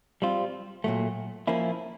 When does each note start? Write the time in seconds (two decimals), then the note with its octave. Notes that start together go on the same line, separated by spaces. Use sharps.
0.22 G3 C4 F4
0.84 A#2 F#3 A3
1.47 F3 A#3 C#4 E4